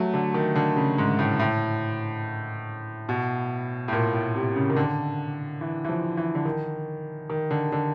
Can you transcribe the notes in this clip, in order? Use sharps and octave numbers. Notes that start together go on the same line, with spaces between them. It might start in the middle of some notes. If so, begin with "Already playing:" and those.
Already playing: F#3 A3
D3
D#3
D3
C#3
G#2
A2
A2
B2
A2
A#2
A2
C3
C#3
D#3
D3
E3
E3
F3
E3
D3
D#3
D#3
D3
D3